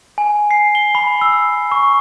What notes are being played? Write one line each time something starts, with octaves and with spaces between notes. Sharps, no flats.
G#5
C7
G7
B5
E6
C#6